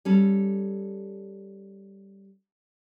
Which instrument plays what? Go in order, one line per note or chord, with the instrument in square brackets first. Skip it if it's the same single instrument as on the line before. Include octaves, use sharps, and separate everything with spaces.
[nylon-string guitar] G3 C#4 A4